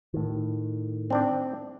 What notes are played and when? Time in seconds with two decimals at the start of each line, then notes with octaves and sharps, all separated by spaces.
0.14 A2 D#3
1.10 C4 D4 D5